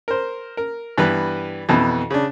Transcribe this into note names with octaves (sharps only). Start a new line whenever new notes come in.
A#4 C5
A#4
G2 E3 B3 B4 B5
F2 B2 E3
C#3 D4